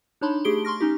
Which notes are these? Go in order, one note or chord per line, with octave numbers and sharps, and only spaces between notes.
D4 D#4 C#5 A5 B5 C6
A3 G4 G#4 D7 G7
C6 C#6 F6 A#6
C#4 D#4 G4